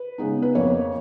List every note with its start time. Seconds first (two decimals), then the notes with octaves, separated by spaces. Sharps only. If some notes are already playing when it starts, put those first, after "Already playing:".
Already playing: B4
0.18 C#3 G#3 B3 D#4
0.42 B4
0.55 F2 F3 A#3 C#5